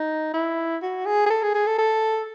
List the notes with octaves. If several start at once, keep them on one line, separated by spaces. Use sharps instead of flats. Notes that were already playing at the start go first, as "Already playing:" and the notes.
Already playing: D#4
E4
F#4
G#4
G#4
A4
G#4
G#4
A4
A4